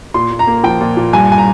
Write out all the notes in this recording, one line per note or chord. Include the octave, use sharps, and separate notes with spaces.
A#2 C6
A#2
A#5
A#3
F3 G5
A#2
A#2
G2 G#5
G#5
A#5